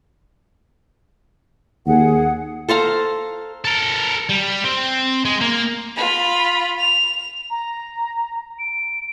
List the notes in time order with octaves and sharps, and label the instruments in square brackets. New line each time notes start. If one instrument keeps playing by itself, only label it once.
[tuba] D#2 [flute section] G#4 F#5
[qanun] A4 C5 F5 A#5
[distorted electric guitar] A4 A#4
G3
C4
G#3
A#3
[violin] F4 B5
F7
[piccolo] A#5
D7